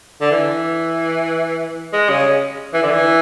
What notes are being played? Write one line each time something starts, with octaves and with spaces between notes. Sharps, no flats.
D3
E3
G#3
C#3
E3
D3
E3